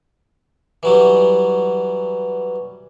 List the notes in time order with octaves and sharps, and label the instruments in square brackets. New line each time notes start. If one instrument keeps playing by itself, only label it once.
[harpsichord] E3 F#3 G3